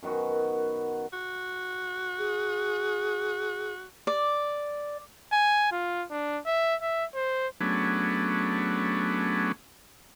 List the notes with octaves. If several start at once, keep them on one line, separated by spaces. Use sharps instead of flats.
F#2 D#3 B3 F#4
F#4
G#4
D5
G#5
F4
D4
E5
E5
C5
F#3 A3 B3 C#4 D4 G#4